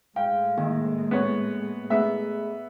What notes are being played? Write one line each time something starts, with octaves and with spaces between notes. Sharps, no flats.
A2 G#3 F5 G5
D#3 A#3
B3 C#5
A3 B3 G#4 E5 B5